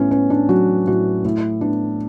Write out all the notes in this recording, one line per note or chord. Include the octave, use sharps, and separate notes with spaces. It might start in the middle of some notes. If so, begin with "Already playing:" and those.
Already playing: A2 B3 C#4
B3 C#4
D4
F#3 F#4
A2 F#4
A2
B3 D4